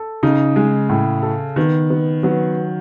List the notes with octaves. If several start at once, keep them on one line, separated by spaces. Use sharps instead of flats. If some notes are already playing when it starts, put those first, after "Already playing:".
Already playing: A4
C#3 D#4
G#3
A2
A4
D#3 B3
B3
F#3 B3